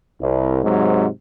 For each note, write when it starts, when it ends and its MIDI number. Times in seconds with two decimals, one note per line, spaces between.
0.20 0.59 36
0.63 1.07 44
0.63 1.07 48
0.63 1.07 54
0.63 1.07 56